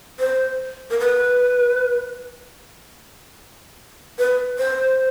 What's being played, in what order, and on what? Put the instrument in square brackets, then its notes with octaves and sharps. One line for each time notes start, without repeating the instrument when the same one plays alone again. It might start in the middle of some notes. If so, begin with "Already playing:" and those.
[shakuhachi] C5
A#4
B4
B4
C5